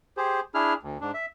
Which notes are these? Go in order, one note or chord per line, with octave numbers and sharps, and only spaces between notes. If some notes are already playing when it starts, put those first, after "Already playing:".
G4 G#4 C5
D4 E4 G#4 F6
D2
G#2 D4
E5